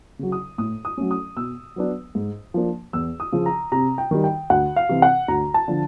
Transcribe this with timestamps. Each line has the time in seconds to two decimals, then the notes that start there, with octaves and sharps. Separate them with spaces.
0.19 C#3 F#3
0.32 D#6
0.58 A2 D#6
0.85 D#6
0.98 F#3 A3 C#4
1.11 D#6
1.37 B2 E6
1.76 F#3 B3 D4
2.15 G#2
2.54 F3 A#3 D4
2.93 E2 E6
3.20 D#6
3.32 C#3 F3
3.46 A#5
3.72 C3 A#5
3.98 G5
4.11 D#3 G3
4.24 G5
4.50 D2 F#5
4.76 F5
4.89 C3 E3
5.02 F#5
5.28 D2 A#5
5.54 A5
5.68 D3 F3